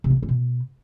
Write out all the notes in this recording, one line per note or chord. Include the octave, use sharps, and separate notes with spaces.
C3
B3
B2
C#4
B2